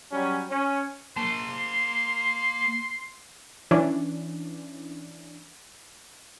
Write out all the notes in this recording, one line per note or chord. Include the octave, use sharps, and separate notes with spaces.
F#3 G3 C#4
C#4
A#3 A5 C6
E3 C#4 D4